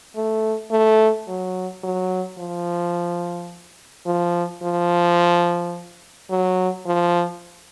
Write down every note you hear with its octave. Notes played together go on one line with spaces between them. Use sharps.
A3
A3
F#3
F#3
F3
F3
F3
F#3
F3